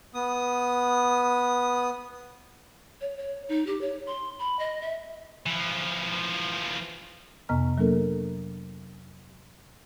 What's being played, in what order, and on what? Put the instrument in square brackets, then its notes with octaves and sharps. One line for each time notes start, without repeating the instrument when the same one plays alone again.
[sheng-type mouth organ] B3 D#6
[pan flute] C#5
C#5
D#4
G4
C#5
C6
B5
D#5
E5
[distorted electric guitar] E3 F3
[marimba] F2 C3 B3 D#5 A#5 F6
F#3 A#3 D4 A4 A#4